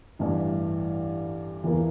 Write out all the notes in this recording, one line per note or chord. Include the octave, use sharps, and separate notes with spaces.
A1 G2 E3
E2 E3 A#3